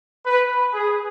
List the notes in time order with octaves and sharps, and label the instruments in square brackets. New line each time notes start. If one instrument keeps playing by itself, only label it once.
[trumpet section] B4
G#4